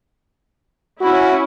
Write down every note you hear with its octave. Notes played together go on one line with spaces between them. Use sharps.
C#4 E4 F#4